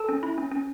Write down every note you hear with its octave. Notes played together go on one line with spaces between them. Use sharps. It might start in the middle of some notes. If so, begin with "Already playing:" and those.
Already playing: A4 A5
C#4
E4
C#4
C#4